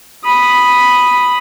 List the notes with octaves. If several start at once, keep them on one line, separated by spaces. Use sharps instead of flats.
B5 D#6